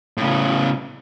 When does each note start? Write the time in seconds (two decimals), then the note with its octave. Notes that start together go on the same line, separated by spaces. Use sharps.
0.17 A2 C#3